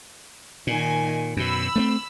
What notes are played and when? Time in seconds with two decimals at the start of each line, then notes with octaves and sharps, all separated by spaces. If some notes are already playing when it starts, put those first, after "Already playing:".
0.67 A#2 D#3 G#5
1.37 F#2 B2 B5 E6
1.76 A3 A#3 C4